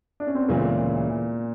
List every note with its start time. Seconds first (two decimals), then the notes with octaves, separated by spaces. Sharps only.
0.20 D4
0.27 C#4
0.35 C4
0.42 B3
0.48 D2 A#2 C#3 E3 G#3 A#3